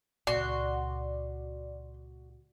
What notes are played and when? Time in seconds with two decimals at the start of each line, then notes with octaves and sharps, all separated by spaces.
0.27 C#2 A#2 F#4 D5 C6